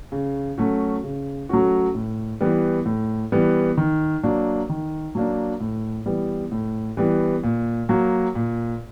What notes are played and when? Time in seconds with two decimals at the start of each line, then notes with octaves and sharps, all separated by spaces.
0.12 C#3
0.58 F#3 A3 C#4 F#4
1.03 C#3
1.49 F#3 A3 C#4 F#4
1.95 A2
2.40 E3 G3 B3
2.85 A2
3.32 E3 G3 B3
3.77 D#3
4.23 F#3 A#3 D4
4.69 D#3
5.15 F#3 A#3 D4
5.60 A2
6.06 E3 G3 B3
6.52 A2
6.97 E3 G3 B3
7.43 A#2
7.89 F#3 A#3
8.35 A#2